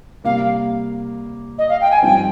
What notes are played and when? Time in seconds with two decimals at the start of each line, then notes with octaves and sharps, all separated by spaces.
0.24 C3 G3 A#3 F5
1.58 D#5
1.69 F5
1.81 G5
1.91 G#5
2.02 G2 F3 C4 D#4 G5